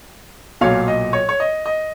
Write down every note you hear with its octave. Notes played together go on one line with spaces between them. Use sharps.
B1 A#2 F#3 C#5 F5
D#5
C#5
C#5
D#5
D#5